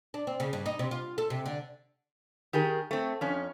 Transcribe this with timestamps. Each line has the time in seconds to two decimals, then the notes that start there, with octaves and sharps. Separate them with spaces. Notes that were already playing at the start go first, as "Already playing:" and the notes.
0.14 D4
0.27 C4
0.40 C#3
0.53 G2
0.66 D#4
0.79 C3
0.91 F4
1.18 A4
1.30 C3
1.46 D3
2.53 D#3 G4 G#4 A#4
2.91 A3 C4
3.21 F2 C#4